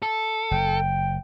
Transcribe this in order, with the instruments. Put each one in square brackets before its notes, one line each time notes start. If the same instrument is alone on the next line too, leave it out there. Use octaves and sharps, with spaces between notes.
[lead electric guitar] A4
[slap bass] F#1 [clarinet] G5